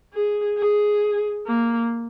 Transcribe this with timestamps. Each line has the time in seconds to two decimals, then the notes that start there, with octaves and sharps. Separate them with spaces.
0.14 G#4
0.58 G#4
1.46 A#3